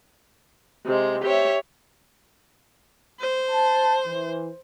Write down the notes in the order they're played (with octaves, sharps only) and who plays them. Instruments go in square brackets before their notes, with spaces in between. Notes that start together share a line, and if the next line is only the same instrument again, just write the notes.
[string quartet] C3 G#3
G4 C#5 E5
[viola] C5
[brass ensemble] A5
E3